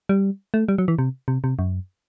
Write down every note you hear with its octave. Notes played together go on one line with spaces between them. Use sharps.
G3
A3
G3
F#3
E3
C3
C3
C3
F#2